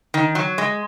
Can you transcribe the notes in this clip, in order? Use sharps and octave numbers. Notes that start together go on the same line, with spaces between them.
D#3
F#3
G#3